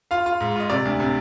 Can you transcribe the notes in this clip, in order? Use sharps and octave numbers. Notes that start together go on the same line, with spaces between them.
F4 F5
F4
G#2
F4 D#5
C3 D5
D2
C3